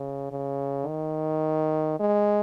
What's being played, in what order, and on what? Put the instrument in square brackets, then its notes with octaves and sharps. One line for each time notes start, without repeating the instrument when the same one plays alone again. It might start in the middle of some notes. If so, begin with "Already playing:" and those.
Already playing: [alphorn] C#3
C#3
D#3
G#3